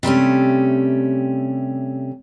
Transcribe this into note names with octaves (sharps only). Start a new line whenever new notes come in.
C3 G3 A3 C#4